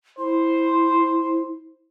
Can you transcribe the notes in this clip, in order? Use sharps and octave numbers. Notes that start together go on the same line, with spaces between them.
E4 C5